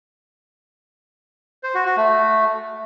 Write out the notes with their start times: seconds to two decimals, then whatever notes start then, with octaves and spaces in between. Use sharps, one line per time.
1.63 C5
1.75 F#4
1.86 F#4
1.97 A3